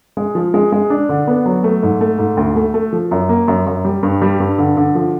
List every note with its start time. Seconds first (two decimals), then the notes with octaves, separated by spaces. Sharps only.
0.17 G#3
0.35 F3
0.54 G#3
0.72 G#3
0.90 D4
1.09 D3
1.27 B3
1.46 F#3
1.64 A3
1.83 G#2
2.01 A3
2.19 G#2
2.37 D2
2.56 A3
2.74 A3
2.93 F3
3.11 F#2
3.29 A#3
3.48 F#2
3.67 F#2
3.85 G3
4.03 G2
4.22 G3
4.40 G2
4.58 D3
4.77 D3
4.95 F3